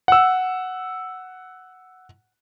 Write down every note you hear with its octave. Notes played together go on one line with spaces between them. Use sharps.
F#5 E6